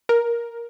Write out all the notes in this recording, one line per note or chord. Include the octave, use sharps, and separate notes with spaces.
A#4